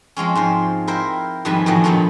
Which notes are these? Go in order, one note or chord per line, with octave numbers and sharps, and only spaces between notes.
F3 G#3 C4 C#4
G#2 F3 C5
E4 A#4 C5 G5
F2 G#2 D#3 G3 B4 G#5
E2 A2 D#3 F3 F#3
G2 A#2 F3 A3 D#4